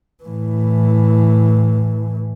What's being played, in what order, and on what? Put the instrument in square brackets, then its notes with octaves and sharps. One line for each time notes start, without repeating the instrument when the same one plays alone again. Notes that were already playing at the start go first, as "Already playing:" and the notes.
[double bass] A2 E3